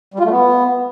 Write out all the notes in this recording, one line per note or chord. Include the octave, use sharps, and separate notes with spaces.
G3
F4
A3
B3